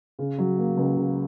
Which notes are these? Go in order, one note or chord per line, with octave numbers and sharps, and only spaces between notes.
C#3
F#3
A#3
C#2
C#3